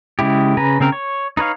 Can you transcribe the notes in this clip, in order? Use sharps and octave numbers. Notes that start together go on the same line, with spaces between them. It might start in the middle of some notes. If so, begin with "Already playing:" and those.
C#3 G#3 E4 G4
C#3 B4 G#5 A#5
C#3 C4 A#4
C#5
D#4 B4 C#5 F5